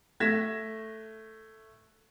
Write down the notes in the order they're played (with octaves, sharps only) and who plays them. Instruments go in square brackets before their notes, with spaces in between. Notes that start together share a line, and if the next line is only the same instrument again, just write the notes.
[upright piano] A3 G#6 A#6 B6 E7